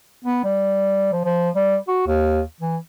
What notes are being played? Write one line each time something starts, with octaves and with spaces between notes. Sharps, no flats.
B3
G3
F3
F3
G3
F#4
D#2
E3